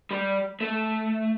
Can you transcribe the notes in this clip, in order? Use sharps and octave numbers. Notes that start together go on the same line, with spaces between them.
G3
A3